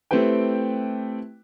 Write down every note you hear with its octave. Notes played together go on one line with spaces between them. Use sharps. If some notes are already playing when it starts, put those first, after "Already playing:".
A3 C4 E4 G4 B4 G5